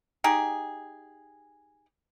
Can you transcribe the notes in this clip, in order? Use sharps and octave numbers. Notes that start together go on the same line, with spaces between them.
D#4 G4 G#4